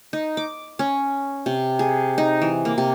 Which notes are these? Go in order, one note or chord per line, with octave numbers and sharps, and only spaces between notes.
D#4
D6
C#4
C3
G#4
D#4
E3
A#3
C3